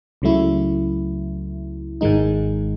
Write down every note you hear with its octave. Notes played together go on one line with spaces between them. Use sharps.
C#2 C#3 F#3 A3 E4
G#1 G#2 D#3 G#3 D#4